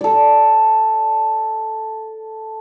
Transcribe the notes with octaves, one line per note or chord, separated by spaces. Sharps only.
A4 D5